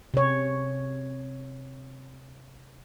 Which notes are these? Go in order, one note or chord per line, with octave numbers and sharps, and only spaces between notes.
C3 C#5